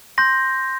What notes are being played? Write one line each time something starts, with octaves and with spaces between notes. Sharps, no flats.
C6 G6 A#6